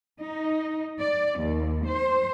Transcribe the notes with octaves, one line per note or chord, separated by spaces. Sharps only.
D#4
D5
D#2
C5